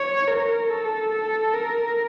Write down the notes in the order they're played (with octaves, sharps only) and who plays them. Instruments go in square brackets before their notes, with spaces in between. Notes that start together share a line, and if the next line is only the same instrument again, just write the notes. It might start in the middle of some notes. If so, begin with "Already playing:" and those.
Already playing: [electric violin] C#5
A#4
A4
A4
A#4